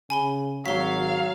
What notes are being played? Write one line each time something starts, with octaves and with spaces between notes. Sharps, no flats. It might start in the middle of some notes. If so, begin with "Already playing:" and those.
C#3 G#5 B5 G7
G#1 F#3 F5 B6 G7